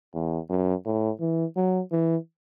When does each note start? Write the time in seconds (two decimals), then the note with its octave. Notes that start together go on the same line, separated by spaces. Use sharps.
0.14 E2
0.50 F#2
0.86 A2
1.20 E3
1.56 F#3
1.92 E3